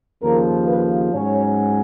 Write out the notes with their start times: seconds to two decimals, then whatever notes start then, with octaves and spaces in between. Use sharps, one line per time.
0.22 D#2 C#3 F3 A#4
0.68 B4
1.14 G#2 F#3 C#4 C#5